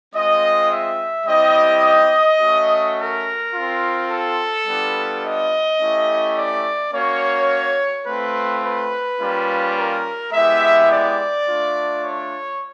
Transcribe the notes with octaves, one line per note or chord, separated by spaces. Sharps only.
G#3 C4 F4 D#5
E5
G3 C4 E4 G4 D#5
A3 C#4 F#4
A#4
C4 F4
A4
G3 B3 D4 F4
D#5
A3 C#4 E4 G4
D5
A#3 C#4 F#4 C#5
A3 C4 F4 B4
B4
G3 A#3 C#4 F4
A#4
G#3 B3 E4 G4 E5
D5
A3 D4 F4
C#5